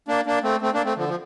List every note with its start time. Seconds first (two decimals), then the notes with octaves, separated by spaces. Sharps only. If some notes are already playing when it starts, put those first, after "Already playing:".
0.08 A#3 D4
0.26 A#3 D4
0.44 A3 C4
0.61 A3 C4
0.74 A#3 D4
0.85 A3 C4
0.97 D3 F3
1.08 F3